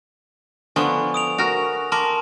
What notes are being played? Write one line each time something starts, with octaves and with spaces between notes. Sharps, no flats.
D3 F3 B3 G#5 C#6
D#6 D7 F7
F#4 A#4
A#4 A5 C6 D6